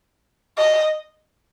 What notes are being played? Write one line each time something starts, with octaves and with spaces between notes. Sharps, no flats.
D#5